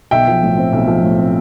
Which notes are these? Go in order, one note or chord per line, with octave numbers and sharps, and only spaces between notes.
B1 E5 G5
F3
A2
C4
B1
F3
A2
C4